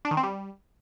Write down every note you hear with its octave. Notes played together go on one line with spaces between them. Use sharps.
D4
D#3
C4
G3